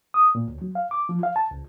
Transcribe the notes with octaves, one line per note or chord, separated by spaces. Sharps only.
D#6
A#2
D2
F#3
F5
D6
F3
F5
A5
C#2